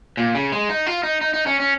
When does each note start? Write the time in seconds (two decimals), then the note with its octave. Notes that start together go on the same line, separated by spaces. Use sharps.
0.17 A#2
0.35 C#3
0.52 G#3
0.69 D#4
0.87 F4
1.03 D#4
1.21 D#4
1.34 D#4
1.46 C#4
1.60 C#4